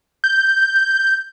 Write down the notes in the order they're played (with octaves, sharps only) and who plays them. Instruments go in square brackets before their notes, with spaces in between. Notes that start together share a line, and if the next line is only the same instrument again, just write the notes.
[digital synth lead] G6